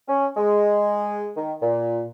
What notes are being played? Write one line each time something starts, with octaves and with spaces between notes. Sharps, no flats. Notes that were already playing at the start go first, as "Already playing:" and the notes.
C#4
G#3
D#3
A#2